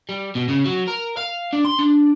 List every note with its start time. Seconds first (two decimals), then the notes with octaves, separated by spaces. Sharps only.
0.09 G3
0.35 B2
0.49 C#3
0.65 F#3
0.87 A#4
1.17 F5
1.53 D4
1.65 C6
1.79 D4